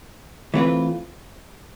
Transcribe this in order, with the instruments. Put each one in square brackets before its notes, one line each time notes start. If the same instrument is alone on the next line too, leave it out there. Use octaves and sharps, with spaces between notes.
[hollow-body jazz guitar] E3 A3 C4 F4 B4